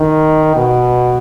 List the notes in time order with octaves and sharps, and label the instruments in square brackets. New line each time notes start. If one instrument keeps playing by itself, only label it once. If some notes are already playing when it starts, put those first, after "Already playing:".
Already playing: [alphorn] D#3
B2